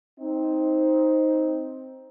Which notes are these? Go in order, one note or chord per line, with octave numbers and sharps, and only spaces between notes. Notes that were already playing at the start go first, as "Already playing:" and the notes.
C4 D#4